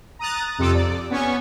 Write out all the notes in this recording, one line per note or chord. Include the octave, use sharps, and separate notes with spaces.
A#5 D#6 F#6 A6
F2 C3 F4 A4 D6
D5
B3 C#4 G#5 C#6